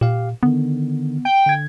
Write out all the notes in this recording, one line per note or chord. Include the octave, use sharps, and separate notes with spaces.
A#2 G4 F5
D3 D#3 B3
G5
D3 G#6